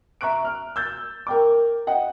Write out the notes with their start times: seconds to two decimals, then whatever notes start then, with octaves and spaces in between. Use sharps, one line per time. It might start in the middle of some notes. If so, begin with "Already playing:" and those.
0.21 E5 A#5 C#6 F#6 D7
0.45 F6
0.76 E6 G6 A6
1.27 A#4 G5 D6
1.87 D#5 F#5 G5